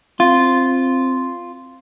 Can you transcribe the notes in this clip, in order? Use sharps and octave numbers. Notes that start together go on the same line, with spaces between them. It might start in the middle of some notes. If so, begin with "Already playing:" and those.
C4 F4